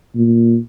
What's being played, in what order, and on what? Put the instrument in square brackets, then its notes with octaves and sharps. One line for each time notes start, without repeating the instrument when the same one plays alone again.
[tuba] A#2